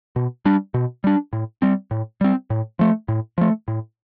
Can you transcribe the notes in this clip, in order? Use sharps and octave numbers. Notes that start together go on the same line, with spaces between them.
B2
G3 D4
B2
G3 D4
A2
G3 C4
A2
G3 C4
A2
F3 A3
A2
F3 A3
A2